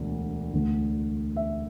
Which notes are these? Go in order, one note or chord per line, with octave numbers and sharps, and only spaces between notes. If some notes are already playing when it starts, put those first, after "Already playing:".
Already playing: E1 D2 D3
D2 D3 A3
E5